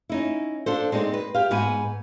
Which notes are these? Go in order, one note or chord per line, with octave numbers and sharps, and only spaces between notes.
C#4 D#4 E4
D4 F4 A4 C5
G#3 C4 D#4 D5
B4
G4 F5
G#2 B3 B4 G#5